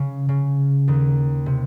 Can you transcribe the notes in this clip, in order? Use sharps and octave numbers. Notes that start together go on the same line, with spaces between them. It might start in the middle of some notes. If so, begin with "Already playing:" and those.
Already playing: C#3
C#3
D#2 D#3
C3